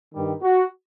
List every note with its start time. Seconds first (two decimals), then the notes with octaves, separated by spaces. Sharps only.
0.13 G2 D#3 G3
0.42 F#4